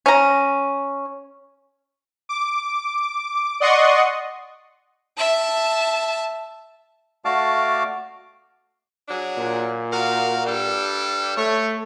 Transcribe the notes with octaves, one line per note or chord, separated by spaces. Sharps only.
C#4 A#5
D6
D5 D#5 F#5 C6 C#6 D#6
E5 A5
A3 F#4 D5 F5 A5 D6
F#3 D4 G#4
A#2
F#4 A#4 F5
G2 G3 A4
A3 C#5